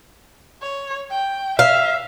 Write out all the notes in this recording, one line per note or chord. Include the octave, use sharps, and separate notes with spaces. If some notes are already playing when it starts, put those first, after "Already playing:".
C#5
G5
E5 F5